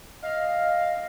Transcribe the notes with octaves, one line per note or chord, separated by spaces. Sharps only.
D#5 F5